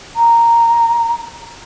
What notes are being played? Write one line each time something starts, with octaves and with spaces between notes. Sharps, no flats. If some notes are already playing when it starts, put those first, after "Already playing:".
A#5